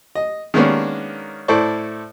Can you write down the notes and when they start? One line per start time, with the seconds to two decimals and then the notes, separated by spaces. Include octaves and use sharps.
0.15 D#5
0.54 D#3 G#3 A#3 B3 C#4 D4
1.48 A2 E4 A4 C5 D5 C#6